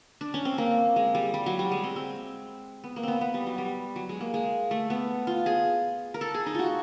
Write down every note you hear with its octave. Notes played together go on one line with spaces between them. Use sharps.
D4
C#4
C4
A#3
G#3
G3
G3
F#3
G3
G#3
C4
C4
B3
A#3
B3 C4
B3
G3
F#3
G3
F#3
G#3
A#3
G#3
A3
B3
F4
G#4
A#4
A4
G#4
D#4
F4 F#4